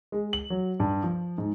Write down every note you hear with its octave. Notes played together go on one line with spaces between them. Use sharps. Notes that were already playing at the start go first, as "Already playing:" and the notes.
G#3
F#7
F#3
G2
F3
G#2